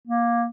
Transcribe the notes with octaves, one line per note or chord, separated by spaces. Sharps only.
A#3